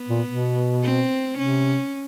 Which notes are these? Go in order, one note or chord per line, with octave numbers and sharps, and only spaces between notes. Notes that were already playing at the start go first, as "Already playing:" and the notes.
Already playing: B3
A#2
B2
C4
C3 C#4